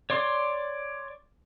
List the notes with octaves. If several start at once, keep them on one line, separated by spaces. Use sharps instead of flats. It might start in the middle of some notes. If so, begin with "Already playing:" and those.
C#5 D5 C6